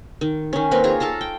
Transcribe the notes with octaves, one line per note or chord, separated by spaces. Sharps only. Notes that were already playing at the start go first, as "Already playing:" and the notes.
D#3
D#3 C#4
A#3 C4 A#4 B4
F4 G#4 C#5 A#5
A4 F5 A5 A#5
G5